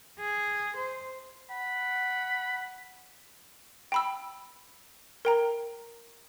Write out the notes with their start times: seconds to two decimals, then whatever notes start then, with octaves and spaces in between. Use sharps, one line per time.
0.20 G#4
0.77 C5
1.50 F#5 B5
3.92 G5 B5 E6
5.25 A#4 G5 A#5